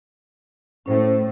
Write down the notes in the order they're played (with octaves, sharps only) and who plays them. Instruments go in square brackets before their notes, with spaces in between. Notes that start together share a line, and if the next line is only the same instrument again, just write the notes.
[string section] A2 A3 [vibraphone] C#4 C5